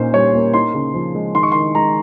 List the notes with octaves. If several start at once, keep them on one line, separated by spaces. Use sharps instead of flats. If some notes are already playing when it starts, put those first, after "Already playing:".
Already playing: A#2 C#4 D#4 C5
G3 C#5
A#3
D#4 C6
C#3
F3
G#3
D#3 C6
C#6
D#3 C6
G#3 A#5